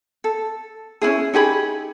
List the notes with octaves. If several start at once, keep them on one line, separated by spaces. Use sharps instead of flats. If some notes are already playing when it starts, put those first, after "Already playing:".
A4
C#4 D4 E4 G#4
D#4 G4 G#4 B5